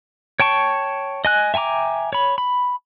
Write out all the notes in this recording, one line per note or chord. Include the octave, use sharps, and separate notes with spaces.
C#5 G5 A5 C#6
D#5 G#5 F#6
E5 G5 G#5 A#5 D6
C#5 B5
B5